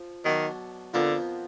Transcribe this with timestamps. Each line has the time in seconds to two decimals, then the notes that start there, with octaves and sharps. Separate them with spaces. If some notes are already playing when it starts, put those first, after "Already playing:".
Already playing: F3
0.24 B2 D#3 F#3 D4
0.94 F2 D3 F3 B3 F4 A#4